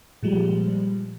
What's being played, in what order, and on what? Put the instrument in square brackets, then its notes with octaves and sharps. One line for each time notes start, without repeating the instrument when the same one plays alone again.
[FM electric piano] A#2 F3 G3 G#3